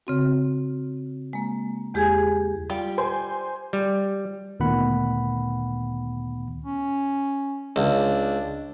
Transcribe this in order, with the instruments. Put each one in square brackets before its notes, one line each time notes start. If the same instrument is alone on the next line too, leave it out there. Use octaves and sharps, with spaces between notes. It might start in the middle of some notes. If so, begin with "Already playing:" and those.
[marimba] C#3 C4 F#4
G#3 A#3
E2 G#3 G4 G#4 G#5 G#6
[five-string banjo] G3 F4 G4
[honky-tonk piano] C5 G#5 C6
[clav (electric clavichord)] G3
[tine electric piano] D2 A#2 D#3 B3 F#5 B5
[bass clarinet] C#4
[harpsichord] C#2 [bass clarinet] D4